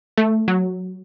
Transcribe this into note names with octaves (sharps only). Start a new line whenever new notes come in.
A3
F#3